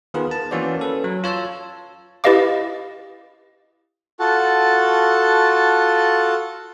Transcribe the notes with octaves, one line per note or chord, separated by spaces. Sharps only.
D#3 B3 F4 G#4 A#4 B4
A5
E3 A#3 C#4 F#4 C5 D5
C#4 A4 B4
F#3
F4 C#5 A5 E6
E4 G4 B4 D#5 F5 D6
F4 F#4 A4 F#5 A5